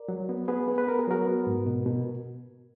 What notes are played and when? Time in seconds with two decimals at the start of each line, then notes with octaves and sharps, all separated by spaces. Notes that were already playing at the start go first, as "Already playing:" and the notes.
Already playing: A#4 D5
0.09 F#3
0.29 B3
0.48 B3 G#4 B4
0.68 B3
0.78 B4
0.87 B3 A#4
0.99 G#4
1.07 F#3 F#4 A#4
1.26 B3
1.47 G#2
1.66 B2
1.86 B2